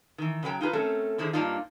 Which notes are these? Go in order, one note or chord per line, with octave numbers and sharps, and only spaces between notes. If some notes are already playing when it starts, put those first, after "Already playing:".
D#3 E3
C#3 F#3 B4 G5 A#5
D#4 F4 G#4 B4
A3 C4 C#4 A4 A#4
D3 D#3 E4 G#4 C5
G2 C3 A#3 D4 D#4 F4